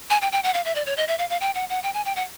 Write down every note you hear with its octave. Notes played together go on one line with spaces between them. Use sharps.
G#5
G5
G5
F#5
F5
E5
D5
C#5
D#5
E5
F5
F5
G5
F#5
F#5
G5
G#5
G5
F#5